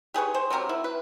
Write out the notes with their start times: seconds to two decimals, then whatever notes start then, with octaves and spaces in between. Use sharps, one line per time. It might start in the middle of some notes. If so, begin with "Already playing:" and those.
0.14 G4 G#4 B4 C#6
0.34 C5
0.50 F#3 C4 G4 A#4
0.69 E4
0.84 B4